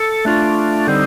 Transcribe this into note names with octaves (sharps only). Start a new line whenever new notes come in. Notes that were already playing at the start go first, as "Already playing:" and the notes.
Already playing: A4
A3 D4 F4
D3 G3 C4 D#4